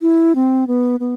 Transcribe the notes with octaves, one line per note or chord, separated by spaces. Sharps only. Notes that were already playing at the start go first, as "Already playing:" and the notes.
E4
C4
B3
B3